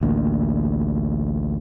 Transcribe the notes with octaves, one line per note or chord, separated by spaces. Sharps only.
A1 D2 A#3